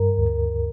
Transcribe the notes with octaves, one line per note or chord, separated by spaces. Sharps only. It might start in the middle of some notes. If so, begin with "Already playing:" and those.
Already playing: G2 A#4
D2